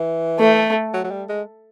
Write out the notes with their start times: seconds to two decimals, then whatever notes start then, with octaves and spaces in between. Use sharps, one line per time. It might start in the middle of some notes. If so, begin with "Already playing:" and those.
Already playing: E3
0.39 A3
0.94 F#3
1.04 F#3
1.11 G3
1.29 G#3